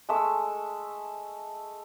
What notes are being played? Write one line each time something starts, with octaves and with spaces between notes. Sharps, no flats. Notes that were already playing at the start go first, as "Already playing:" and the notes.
G#3 A3 E5 E6